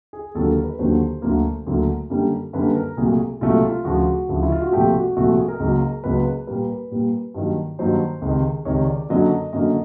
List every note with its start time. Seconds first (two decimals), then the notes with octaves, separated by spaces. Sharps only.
0.13 G#4
0.35 D#2 D3 F#3 A#3 A4
0.50 A#4
0.64 B4
0.79 D#2 D3 F#3 A#3 C5
1.22 D2 D3 F#3 A#3
1.67 D2 D3 F#3 A#3
2.10 F#2 D3 G3 A#3
2.53 F#2 D3 G3 A#3 B4
2.75 A#4
2.97 C2 A#2 F#3 A3 G#4
3.41 C2 A#2 F#3 A3 F4
3.63 F4
3.85 D2 C#3 F3 F#4
4.29 D2 C#3 F3
4.42 E4
4.52 F4
4.62 F#4
4.72 C2 A#2 F3 A3 G4
4.94 F#4
5.16 C2 A#2 F3 A3 F#4
5.27 F#4
5.38 G#4
5.48 A#4
5.60 C#2 C#3 F#3 A#3
6.04 C#2 C#3 F#3 A#3 B4
6.47 A#2 G3 A#3 B4
6.91 A#2 G3 A#3
7.34 G2 D#3 F#3 A#3
7.79 G2 D#3 F#3 A#3 C5
8.22 C#2 C3 D#3
8.65 C#2 C3 D#3 C#5
8.87 D5
9.09 F#2 D3 F#3 A#3 D#5
9.53 F#2 D3 F#3 A#3 D#5